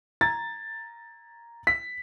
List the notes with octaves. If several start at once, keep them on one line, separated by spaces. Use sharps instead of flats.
A#5 G#6 A6
B6